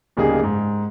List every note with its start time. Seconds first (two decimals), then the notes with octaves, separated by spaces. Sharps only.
0.17 D1 C#3 G3 A#3 D#4 G#4
0.43 G#2